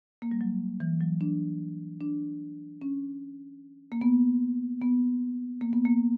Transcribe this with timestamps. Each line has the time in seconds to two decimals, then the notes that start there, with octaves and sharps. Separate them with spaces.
0.22 A#3
0.31 G3
0.41 F#3
0.80 E3
1.01 F#3
1.21 D4
2.01 D4
2.82 C#4
3.92 A#3
4.01 B3
4.82 B3
5.61 A#3
5.73 B3
5.85 A#3